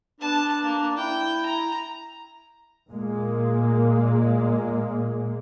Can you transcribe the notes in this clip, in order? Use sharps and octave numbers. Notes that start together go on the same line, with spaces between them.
B3 D4 A5
A#3
E4 G5
A#5
A#2 G#3 A#3